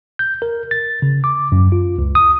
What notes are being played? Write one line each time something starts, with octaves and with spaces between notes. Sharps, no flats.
G6
A#4
A6
C#3
D6
F#2
F4
C#2
D#6